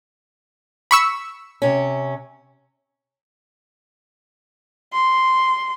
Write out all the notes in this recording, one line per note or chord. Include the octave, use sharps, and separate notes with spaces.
B5 C#6 E6
C3 C#4
C6